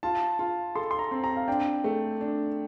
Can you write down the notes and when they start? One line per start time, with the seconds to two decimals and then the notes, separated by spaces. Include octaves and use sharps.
0.03 F4 A5
0.39 F4
0.75 A4 C6
0.91 C6
0.99 A#5
1.11 C4
1.24 A#5
1.37 F5
1.48 D4 G5
1.84 A3
2.21 D4